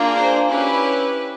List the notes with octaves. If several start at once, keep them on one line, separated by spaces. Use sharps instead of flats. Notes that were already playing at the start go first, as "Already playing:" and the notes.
Already playing: A#3 D4 F4 G#4
C5
C#4 E4 G4 B4